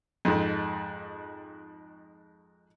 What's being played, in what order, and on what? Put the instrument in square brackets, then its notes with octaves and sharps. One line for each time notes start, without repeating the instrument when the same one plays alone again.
[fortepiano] F2 G#2